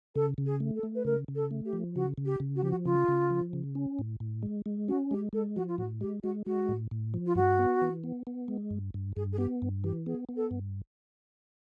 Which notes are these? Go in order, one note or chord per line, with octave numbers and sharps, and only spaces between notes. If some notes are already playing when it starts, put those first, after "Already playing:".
C#3 A4
C#3
G#4
A3
A4
A3
B4
C#3 A#4
C#3
A4
A3
G4
F3
C#3 F#4
C#3
G4
C#3
F#4
F3 G4
F#4
C#3 F4
C#3
F3
C#3
C#4
A2
A2
G#3
G#3
C#4 F#4
G#3 G4
G#3 A4
F3 F#4
F4
A2 F#4
G#3 G4
G#3 F#4
G#3 F#4
A2
A2
F3
F4
G2 F#4
B3
E3
B3
B3
G#3
G2
G2
G2 G#4
G#4
B3 G4
G2
E3 G4
B3 G#4
B3
A4
G2